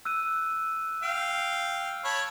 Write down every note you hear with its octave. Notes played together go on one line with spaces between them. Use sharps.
E6 F#6 D#7
F5 G5 D7
C#5 A5 B5